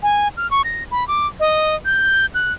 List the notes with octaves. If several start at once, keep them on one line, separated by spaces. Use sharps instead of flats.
G#5
F6
C#6
A#6
B5
D6
D#5
G6
F#6